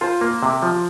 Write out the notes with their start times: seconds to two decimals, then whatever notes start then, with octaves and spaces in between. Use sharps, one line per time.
0.01 F4 C5
0.21 A#3
0.43 C3
0.63 F3